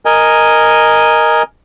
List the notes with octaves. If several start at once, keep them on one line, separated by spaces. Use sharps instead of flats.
A#4 D#5 G#5